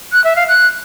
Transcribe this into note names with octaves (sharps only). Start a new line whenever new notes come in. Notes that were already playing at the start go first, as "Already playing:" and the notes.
F#6
E5
F5
F#6